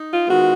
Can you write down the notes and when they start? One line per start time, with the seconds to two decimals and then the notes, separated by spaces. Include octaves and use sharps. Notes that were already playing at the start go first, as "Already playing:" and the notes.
Already playing: D#4
0.09 F4
0.27 D#3 G#3 B3 F4 F#4